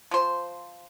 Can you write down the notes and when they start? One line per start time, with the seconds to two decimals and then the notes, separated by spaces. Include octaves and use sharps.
0.11 F3 C5